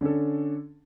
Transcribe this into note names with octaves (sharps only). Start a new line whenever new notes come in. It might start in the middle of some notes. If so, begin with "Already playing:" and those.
D3 C#4 D4 A4